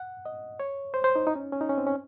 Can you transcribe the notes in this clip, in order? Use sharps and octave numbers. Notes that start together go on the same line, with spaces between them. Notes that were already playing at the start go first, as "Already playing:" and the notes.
Already playing: F#5
D#5
C#5
C5
C5
D#4
D#4
C#4
C#4
D#4
C#4
C4
C#4